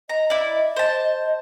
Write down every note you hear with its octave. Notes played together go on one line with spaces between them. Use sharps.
D#5 A#5
E4 D5
C5 A5